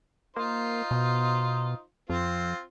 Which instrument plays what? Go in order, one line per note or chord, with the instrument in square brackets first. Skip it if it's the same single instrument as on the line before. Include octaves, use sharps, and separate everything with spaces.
[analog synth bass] A#3 [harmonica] D#4 F4 C5
[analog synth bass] B2
[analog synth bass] F2 [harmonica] C4 F4